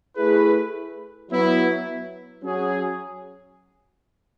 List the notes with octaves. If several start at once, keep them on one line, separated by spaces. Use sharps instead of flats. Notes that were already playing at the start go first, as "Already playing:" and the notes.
A3 E4 G#4 B4
F#3 B3 E4
F#3 C#4 G#4